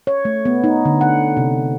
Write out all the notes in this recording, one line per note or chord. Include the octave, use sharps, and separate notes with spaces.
C#5
A3
B3
D#4
D3
F#5
C3